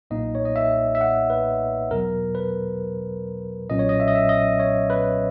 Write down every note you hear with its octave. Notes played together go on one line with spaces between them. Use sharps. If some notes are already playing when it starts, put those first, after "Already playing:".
B1 A#2 A#3 D#4 D#5
C#5
D#5
E5
E5
F#5
B4
E2 B2 F#3 A#4
B4
B1 A#2 F#3 C#4 D#5
C#5
D#5
E5
D#5
E5
D#5
C#5
B4